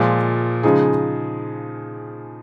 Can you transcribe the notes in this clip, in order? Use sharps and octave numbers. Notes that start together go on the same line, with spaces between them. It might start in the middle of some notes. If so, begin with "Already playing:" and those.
Already playing: A#2 F3 G#3
C#3 F3 G#3 D#4 G#4